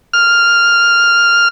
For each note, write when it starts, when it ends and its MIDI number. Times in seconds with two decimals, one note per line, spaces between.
0.13 1.48 89